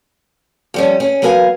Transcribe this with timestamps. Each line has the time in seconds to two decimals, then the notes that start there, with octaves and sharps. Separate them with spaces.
0.74 F2 G3 C#4
1.00 C#4 G#4
1.22 F#3 B3 A#4 F5 G#5